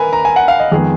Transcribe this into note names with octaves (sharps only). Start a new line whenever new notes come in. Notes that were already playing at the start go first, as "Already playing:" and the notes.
Already playing: A#4 B4 G#5
A#5
G#5
F#5
F5
D#5
F2 D#3 G#3 B3 G#4